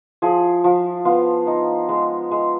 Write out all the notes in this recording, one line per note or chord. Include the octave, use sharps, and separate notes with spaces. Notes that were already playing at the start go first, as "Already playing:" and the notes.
F3 G#4
F3
B3 F4
D#4
G#3
G#3